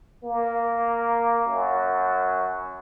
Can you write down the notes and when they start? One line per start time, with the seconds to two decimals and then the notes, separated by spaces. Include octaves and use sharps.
0.24 A#3
1.47 F#2